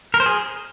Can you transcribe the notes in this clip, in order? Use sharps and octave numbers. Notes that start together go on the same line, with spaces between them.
A#4
C5
G#4